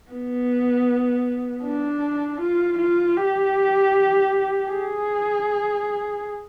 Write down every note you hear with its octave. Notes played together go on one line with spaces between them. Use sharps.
B3
D4
F4
F4
G4
G#4